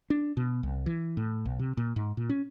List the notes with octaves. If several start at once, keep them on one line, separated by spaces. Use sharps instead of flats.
D4
B2
C2
E3
A2
B1
C3
A#2
G#2
A#2
C#4